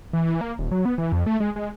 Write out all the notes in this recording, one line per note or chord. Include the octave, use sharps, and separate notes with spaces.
E3
E3
A#3
D#1
F#3
B3
E3
F2
A3
G#3
G#3